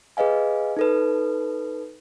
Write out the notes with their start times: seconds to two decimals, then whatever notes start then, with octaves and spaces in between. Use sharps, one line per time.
0.17 G#4 B4 D#5 F5 G#5
0.77 D#4 A4 B4